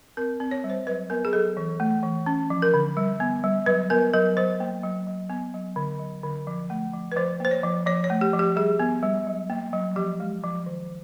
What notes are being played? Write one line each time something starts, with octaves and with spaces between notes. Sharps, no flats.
C4 A#4
C4
C#5
G3
C5
F#3 B4
B3 A#4
G#4
F#3 A4
E3
A3
E3
C#4
F3
A#4
D3
G3
B3
G3
F#3 B4
B3 A#4
F#3 A#4
F#3 C5
A#3
F#3
F#3
B3
F#3
D3
F#3
D3
F3
A3
F3
B4
F3 C5
A#3 C5
C#5
F3
F3 C#5
C#5
A3
G4
F3
G4
G3 G#4
B3
G3
F#3
A#3
F#3
F3 G4
G#3
F3
D#3